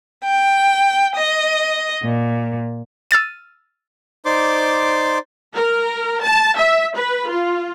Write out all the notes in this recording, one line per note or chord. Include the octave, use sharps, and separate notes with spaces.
G5
D#5
A#2
E6 F6 A6 D#7
D#4 C5 D5 C6 D6
A#4
A5
E5
B4
F4